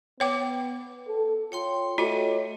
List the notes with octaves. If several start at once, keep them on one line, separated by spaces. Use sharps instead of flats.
B3 C#5 G5 D6
A4
F4 C#5 G5 C6
A3 F4 F#4 C#5 D#5